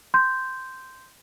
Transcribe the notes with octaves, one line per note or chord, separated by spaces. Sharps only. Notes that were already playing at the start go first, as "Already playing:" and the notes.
C6 G6